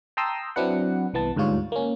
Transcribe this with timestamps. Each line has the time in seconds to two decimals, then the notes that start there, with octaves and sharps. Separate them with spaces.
0.17 G5 A5 A#5 C6 D#6 E6
0.56 F#3 C4 D4 E4 B4 F#5
1.14 C2 E3 B3 A5
1.36 D2 G#2 G3 F4 C#5
1.72 A#3 C#4